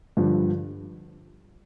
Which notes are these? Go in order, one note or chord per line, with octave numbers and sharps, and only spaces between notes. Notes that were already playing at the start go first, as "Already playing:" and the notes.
G2 D3 F3